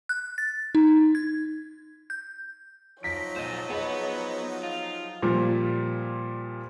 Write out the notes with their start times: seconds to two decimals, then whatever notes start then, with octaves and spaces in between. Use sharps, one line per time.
0.09 F#6
0.38 A6
0.75 D#4
1.15 G#6
2.10 G6
3.03 F3 F#3 D#4 C#5 A#6 B6 D7
3.36 B1 C5 D#5
3.69 B3 G#4 B4 D#5
4.63 F4
5.23 A#2 F3 G3